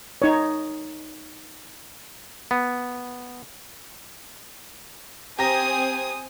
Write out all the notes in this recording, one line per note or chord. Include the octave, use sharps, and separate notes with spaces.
D#4 C#5
B3
C4 G4 G#5 A#5 D#6 A#6